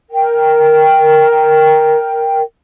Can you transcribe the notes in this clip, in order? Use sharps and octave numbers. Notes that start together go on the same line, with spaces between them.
A#4 G5